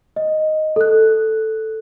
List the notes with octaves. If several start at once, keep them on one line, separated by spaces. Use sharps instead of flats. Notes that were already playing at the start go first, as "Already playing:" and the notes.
D#5
A4 F#6